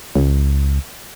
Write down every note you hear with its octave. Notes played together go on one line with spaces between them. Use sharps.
C#2